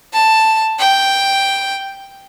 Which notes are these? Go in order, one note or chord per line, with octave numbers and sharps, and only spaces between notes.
A5
G5